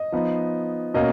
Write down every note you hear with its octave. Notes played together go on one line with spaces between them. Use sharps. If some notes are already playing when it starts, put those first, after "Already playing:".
Already playing: D#5
F3 B3 D#4
B2 A#3 C#4 D#5